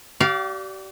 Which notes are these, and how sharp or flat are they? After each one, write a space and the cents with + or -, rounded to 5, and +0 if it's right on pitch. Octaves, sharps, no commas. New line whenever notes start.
G4 -40 D5 -10 F5 +0